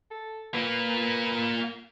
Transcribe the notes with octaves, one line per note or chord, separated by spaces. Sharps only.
A4
A#3 F4 B4